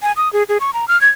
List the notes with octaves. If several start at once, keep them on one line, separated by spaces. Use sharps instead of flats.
G#5
D#6
G#4
G#4
C#6
A#5
F6
G#6